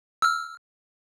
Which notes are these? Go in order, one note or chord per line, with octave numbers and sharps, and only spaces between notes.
E6 F6